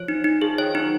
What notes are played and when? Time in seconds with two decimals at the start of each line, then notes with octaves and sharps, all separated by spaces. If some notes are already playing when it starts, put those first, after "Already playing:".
Already playing: F3 C#5
0.08 D#4
0.24 D#4
0.41 F3 G#4
0.58 D#3 C#5
0.74 F#3 D#4